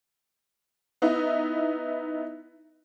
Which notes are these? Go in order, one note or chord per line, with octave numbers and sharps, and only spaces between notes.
B3 D#4 E4